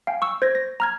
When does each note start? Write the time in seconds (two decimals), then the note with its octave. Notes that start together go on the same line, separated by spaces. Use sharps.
0.07 F5 G5 G#5
0.22 C#6 E6
0.42 C5 G#6 A#6
0.55 A#6
0.80 A#5 F6 G#6